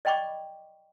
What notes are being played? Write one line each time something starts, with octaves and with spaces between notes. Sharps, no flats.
D5 D#5 G5 B5 C#6 D6